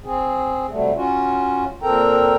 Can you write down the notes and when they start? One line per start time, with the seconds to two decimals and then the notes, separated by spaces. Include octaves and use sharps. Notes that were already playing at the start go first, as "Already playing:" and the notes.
0.04 C4 G#4
0.70 C3 F#3 G3 A3
0.95 C#4 F4 F#4
1.82 A#2 C4 A4 A#4 G5 A#5